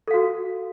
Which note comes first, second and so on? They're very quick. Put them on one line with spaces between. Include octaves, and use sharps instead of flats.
A4 F5 F#4